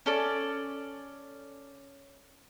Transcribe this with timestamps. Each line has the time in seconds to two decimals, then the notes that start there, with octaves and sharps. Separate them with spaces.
0.06 C#4 A4 D5